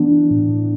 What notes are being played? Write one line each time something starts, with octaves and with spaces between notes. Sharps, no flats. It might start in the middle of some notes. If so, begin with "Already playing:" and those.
Already playing: E3 B3 D4
E3
A2
A2